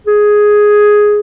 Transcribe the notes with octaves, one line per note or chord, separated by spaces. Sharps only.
G#4